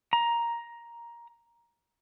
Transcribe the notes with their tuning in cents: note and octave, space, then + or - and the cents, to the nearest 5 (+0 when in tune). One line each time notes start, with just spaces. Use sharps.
A#5 +10